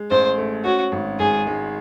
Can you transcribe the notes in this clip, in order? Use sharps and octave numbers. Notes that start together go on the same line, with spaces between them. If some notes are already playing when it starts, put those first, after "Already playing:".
Already playing: G#3
A1 C5
A3
C#4 F#4
G#1
G#1 G#4
G#3